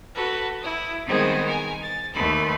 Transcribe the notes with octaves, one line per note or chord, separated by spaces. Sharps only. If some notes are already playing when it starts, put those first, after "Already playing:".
F#4 A4 B4
E4 D#6
D#3 G3 G#3 B3 C4 G#4
A#4 G#5
A6
D#2 A3 B4 B5 C6